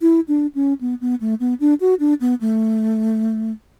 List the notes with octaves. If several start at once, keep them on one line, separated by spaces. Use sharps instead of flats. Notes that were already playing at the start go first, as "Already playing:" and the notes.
E4
D4
C#4
B3
B3
A3
B3
D4
F#4
D4
B3
A3